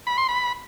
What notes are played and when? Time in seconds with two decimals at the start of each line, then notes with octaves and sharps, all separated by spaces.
0.07 B5
0.18 C6
0.28 B5